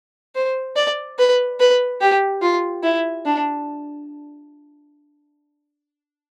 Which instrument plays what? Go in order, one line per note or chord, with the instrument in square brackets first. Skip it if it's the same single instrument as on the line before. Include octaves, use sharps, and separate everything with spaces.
[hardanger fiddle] C5
D5
B4
B4
G4
F4
E4
D4